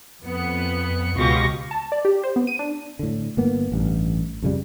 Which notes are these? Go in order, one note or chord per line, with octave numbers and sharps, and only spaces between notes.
F2 B3 C#7
C#2 B2 F4 G4 C#6 A#6
A5
D5
G4
C5
B3
D#7
D4
A2 D3
G1 A#3 B3
A1 G2
F2 C#3 G3